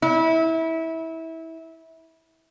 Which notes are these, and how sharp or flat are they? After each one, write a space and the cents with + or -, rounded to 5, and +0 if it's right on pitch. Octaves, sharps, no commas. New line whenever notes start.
E4 -25